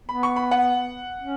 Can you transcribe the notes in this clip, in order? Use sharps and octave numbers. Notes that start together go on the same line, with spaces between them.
B3 B5
C#6
B5
F#5
C#4